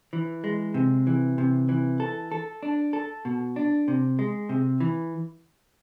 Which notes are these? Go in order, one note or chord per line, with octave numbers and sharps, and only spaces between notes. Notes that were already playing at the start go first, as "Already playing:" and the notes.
E3
G#3
C3
E3
C3
E3
A4
A4
D4
A4
B2
D4
C3
G#3
C3
E3